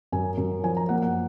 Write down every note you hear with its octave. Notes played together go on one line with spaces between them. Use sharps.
F#2 G#5
F#2
F3 G#5
A#5
A#3 F#5
F#5